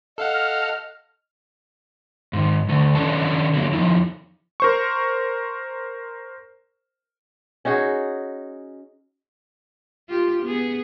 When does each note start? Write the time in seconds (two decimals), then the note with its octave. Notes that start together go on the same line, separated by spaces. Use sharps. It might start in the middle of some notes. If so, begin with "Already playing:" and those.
0.18 A4 D#5 F5 F#5 F6
2.33 G#2 D#3
2.69 D3 A3
2.95 D#3 C#4 D4 A4 B4 A5
3.54 D3 F#3 A#3
3.73 F2 C3 F3 D#4 E4
4.60 A#4 C5 C#6
7.65 C#4 D#4 F#4 G#4
10.09 F4 G4
10.43 B3 G#4